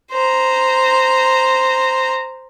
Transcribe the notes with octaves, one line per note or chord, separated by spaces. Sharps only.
C5 A#5